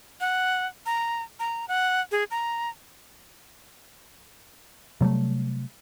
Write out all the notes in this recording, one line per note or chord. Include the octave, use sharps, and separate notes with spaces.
F#5
A#5
A#5
F#5
G#4
A#5
C3 F#3 G3 A3